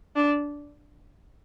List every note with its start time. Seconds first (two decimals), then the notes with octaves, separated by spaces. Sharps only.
0.16 D4